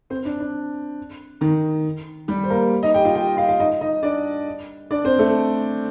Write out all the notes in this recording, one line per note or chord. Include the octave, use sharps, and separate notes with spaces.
C4 C5
D4
D4
D#3 D#4
G3 G4
C5
A#3 A#4
D#4 D#5
G4 G5
F4 F5
G4 G5
F4 F5
F5
D#4 D#5
D#4 D#5
D4 D5
D4 D5
C4 C5
A3 A4